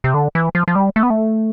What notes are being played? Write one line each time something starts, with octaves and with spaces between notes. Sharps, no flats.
C3
D3
E3
F3
F3
G3
A3
B3
A3